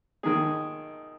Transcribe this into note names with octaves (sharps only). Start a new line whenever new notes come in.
D#2 D#3 G#3 G#4